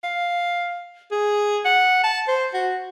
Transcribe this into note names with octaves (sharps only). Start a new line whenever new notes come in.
F5
G#4
F#5
A5
C5
F#4